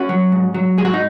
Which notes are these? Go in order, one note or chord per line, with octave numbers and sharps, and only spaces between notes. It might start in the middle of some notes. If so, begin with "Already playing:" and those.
Already playing: C#4 F#4
F#3
G#2
F#3
G#2 G#4
F#4
D#4